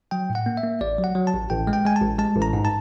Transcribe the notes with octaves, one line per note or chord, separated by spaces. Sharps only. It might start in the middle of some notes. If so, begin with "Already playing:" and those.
F#3 G5
A2
F#5
A#3
E5
A#3
A1 D5
F#3
F#5
F#3
A5
A1
A1 G5
G#3
G5
G#3 G#5
A5
A1
G#3 A5
A1
A#5
G#2
A5